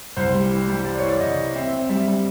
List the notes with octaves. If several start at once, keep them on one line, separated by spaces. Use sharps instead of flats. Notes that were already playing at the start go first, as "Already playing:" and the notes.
C2 C5
G3
E3
G3
E3 D5
E3 C#5
D5
C2 D#5
E3
C4 E5
C4
G3 E5
G3